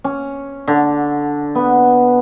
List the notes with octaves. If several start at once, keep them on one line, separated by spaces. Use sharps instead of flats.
C#4
D3
B3